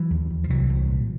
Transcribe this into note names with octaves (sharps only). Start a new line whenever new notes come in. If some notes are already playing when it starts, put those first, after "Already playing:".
Already playing: E3 F#3
D#2
D#2
F3
C2 E3 F#3
C2
A#2